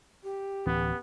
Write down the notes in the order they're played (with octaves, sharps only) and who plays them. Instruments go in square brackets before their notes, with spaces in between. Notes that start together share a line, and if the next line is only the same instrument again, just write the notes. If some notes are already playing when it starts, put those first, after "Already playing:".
[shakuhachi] G4
[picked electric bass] D1 E3 C#4 [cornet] B3